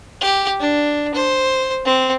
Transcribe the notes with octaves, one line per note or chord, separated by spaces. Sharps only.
G4
D4
C5
C4